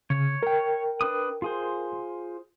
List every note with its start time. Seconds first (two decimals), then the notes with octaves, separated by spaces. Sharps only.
0.10 C#3 C#5
0.43 A#4 G5
1.01 D4 B4 D#6
1.42 F4 G#4 C5